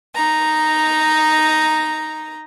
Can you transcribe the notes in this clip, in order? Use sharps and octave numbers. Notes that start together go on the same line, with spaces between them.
D#4 A#5